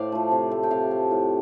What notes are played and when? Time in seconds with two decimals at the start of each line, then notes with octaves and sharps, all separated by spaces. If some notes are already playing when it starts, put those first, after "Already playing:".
Already playing: A2 C5 D5 F5
0.12 F3 A3
0.32 C3
0.51 A3
0.63 G5
0.71 C3 F5
0.91 A3
1.11 A2